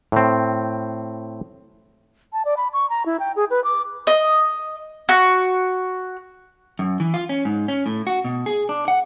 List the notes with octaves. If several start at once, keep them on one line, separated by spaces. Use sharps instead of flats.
A2 C4
A5
D5
B5
C#6
A#5
E4
G5
G#4
B4
D6
D#5
F#4
F#2
E3
F4
C#4
G#2
C#4
A2
F#4
B2
G#4
D4
F#5